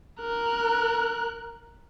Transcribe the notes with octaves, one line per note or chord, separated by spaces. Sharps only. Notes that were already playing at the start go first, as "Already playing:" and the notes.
A#4 F#6